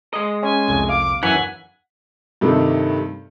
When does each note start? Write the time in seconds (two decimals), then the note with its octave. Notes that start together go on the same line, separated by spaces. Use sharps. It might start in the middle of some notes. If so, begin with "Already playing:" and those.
0.14 G#3 D#5
0.43 C#4 G#5
0.68 C2 F2
0.89 F5 D6
1.23 F#2 E3 C#5 F#5 G#5 B6
2.41 G2 C3 D#3 A3 C4